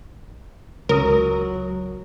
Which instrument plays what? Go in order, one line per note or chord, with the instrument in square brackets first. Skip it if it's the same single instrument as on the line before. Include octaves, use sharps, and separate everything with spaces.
[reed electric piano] C#2 D#6 [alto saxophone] F#3 [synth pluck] A#4